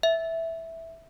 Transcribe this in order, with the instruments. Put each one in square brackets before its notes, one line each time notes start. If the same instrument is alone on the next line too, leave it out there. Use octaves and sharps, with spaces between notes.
[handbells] E5